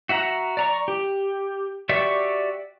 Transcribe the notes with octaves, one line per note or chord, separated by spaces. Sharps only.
F#4 E5 F#5 A#5
D5 A#5 C#6
G4
F#4 G4 D5 E5 C#6